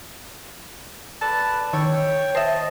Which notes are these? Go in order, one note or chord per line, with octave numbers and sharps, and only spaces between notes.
B4 D5 A5
D#3 A4 C#5 G5 C#6
G5
C5 D#5 E5 A5